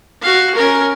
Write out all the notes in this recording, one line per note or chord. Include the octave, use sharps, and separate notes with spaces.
F#4 F5
C#4 A#4